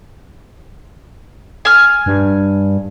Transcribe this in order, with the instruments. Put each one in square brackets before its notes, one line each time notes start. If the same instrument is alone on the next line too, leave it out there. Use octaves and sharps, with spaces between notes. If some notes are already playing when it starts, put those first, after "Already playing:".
[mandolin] G#5 F6
[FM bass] G2